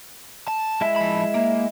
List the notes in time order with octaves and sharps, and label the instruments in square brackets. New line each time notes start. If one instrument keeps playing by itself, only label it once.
[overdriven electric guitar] A5
[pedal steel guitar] G#3 E4 E5
[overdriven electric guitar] F3 B5
A#3